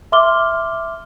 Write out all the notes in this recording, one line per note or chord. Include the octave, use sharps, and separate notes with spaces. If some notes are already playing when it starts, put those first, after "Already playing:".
E5 C6 D6 F6 G7